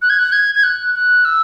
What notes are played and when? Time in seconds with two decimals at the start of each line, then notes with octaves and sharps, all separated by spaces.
0.02 F#6
0.10 G#6
0.19 F#6
0.32 G#6
0.55 G#6
0.64 F#6
0.95 F#6
1.25 E6